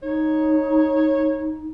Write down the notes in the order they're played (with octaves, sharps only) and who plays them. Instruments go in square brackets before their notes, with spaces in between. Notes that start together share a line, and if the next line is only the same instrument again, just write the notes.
[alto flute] D#4 [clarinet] C#5